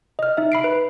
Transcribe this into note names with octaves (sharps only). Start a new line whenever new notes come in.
D#5 F6
D#4 E5
E5 B5 C7 D7
B4